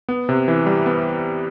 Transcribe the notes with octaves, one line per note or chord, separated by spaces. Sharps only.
B3
C3
E3
G3
B3